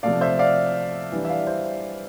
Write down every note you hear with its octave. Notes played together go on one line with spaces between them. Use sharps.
C3 F3 A3 D5 F5
C5 E5
D5 F5
E3 G3 D4
E5
D5 F5
C5 E5